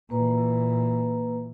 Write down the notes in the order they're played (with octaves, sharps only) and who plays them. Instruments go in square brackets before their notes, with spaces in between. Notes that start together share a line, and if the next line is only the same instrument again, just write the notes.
[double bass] A#2 E3 [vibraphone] A#3 B4 A#5